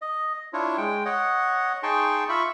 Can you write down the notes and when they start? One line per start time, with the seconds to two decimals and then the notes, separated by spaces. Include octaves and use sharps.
0.02 D#5
0.53 D4 E4 F4 C#5
0.77 G#3 G5
1.05 C#5 D#5 F#5
1.83 D#4 G#4 G5 A5 C6 C#6
2.29 F4 E5 B5 C#6